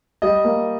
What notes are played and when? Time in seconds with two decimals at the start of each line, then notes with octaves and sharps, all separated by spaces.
0.22 G3 D#5
0.45 A#3